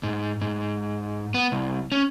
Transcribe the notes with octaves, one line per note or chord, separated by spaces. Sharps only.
G#2
G#2
B3
C2
C#4